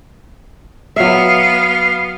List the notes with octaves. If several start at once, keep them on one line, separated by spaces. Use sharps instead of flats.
F#3 B3 E5 F5